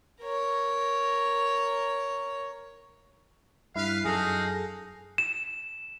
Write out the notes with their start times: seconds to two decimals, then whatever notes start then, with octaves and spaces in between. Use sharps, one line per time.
0.21 A#4 C#5
3.76 G2 E4 B4 F5
4.05 F#2 D#4 F#4 G#4 A4 F5
5.18 E7